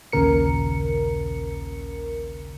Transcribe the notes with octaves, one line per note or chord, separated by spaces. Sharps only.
A#1 D#2 A#2 C#3 A#4 C#7